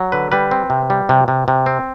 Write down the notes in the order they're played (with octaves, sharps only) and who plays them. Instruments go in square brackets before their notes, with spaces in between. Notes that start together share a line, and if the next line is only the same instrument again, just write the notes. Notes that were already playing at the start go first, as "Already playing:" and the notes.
Already playing: [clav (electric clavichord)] F#3
D3 B4
G3 B4
C4
C3
G3
C3
C3
C3
C4